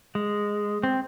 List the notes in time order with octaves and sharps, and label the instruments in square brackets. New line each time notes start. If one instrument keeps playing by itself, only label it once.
[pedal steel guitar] G#3
C4